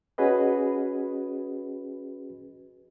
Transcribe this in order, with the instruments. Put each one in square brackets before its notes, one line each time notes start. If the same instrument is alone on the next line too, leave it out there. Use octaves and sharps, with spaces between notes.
[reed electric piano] C#4 F#4 G#4 B4 D#5